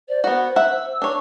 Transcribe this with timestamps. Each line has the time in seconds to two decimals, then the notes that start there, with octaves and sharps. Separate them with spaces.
0.09 C5 D5
0.24 B3 F#4 F#5
0.56 E5 F#5 E6
1.02 D4 C#5